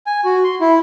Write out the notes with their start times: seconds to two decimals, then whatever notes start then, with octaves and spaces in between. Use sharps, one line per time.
0.06 G#5
0.25 F#4
0.44 C6
0.61 E4